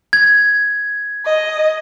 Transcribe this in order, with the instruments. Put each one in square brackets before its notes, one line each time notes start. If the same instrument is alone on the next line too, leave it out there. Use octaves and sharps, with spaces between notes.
[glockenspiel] G#6
[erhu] D#5